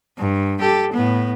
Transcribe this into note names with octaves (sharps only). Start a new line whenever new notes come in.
G2
G4 A4
A2 B3